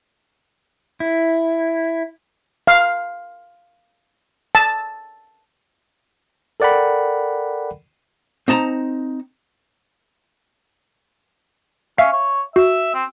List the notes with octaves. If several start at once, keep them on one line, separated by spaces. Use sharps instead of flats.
E4
F5
A5
A4 A#4 D5 F#5 G5 B5
C4 D#4 A5 A#5
C#4 E5 F5
C#5
F#4 E5
C4